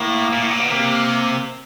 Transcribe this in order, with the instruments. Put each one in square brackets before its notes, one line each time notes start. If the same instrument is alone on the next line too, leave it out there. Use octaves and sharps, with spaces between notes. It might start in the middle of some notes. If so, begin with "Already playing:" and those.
Already playing: [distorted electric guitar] A2 [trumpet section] A#3
[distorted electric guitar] A#2
A2
A#2
B2
[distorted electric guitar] C3 [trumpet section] A#3